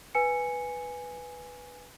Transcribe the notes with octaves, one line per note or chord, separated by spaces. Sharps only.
B4 G#5 C#7